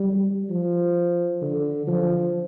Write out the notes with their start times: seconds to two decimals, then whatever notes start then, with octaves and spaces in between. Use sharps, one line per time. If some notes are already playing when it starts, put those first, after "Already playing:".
Already playing: G3
0.50 F3
1.42 D3
1.87 F3